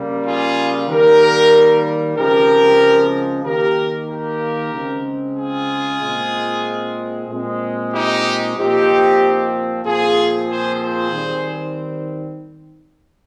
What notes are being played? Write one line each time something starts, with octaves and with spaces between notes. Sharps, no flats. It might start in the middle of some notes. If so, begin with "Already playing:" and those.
Already playing: C#3 G3 A#3
F4 G#4
D#3 G3 A#3 G4 A#4
C#3 F3 G#3 C4 G4 A#4
D#3 A#3 G4 A#4
G4 A#4
C#3 G#3 C4
F4 G#4
A#2 G#3 C4
A#2 G#3 C4
D#4 G4
A#2 F3 C4 D#4 G4
A#2 F3 C4 F4 G#4
G#4 C5
G#4 C5
D#3 G3 C4